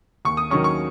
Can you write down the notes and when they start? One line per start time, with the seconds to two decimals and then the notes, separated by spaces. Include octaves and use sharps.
0.25 D#2 C#6
0.37 D#6
0.50 D#3 F#3 C#4 C#6
0.64 C#6